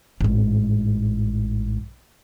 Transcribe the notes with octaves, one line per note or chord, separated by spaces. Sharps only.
A1 G#2